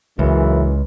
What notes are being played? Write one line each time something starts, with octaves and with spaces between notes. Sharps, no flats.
C#2 F#2 C#3 E3